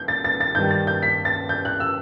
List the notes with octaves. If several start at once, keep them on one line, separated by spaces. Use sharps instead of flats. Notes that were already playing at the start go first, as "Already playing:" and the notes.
Already playing: G6
A6
A6
A6
G2 D#3 G3 G6
A6
G6
B6
A6
G6
F#6
E6